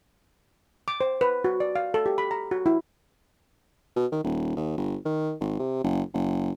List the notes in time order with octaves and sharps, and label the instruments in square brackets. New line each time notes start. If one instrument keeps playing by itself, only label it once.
[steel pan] D6
C5
B4
F#4
D5
F5
A4
G4
B5
A#5
F#4
E4
[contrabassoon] B2
D#3
D#1
D#2
G1
D#3
G#1
C3
F#1
F#1